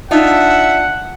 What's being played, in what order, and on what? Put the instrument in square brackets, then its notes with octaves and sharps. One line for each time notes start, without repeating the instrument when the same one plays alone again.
[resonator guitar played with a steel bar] D4 D#4 F4 [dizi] E5 [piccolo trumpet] F#5